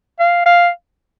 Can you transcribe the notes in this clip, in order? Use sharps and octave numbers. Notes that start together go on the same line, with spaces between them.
F5
F5